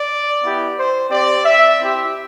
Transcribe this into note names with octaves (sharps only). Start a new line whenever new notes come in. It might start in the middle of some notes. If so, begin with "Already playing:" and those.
Already playing: D5
B3 E4 G4
C5
C4 G4 D5
E5
C4 E4 G4